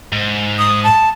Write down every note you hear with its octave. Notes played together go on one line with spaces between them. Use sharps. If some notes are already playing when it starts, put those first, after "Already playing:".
G#2
D#6
A5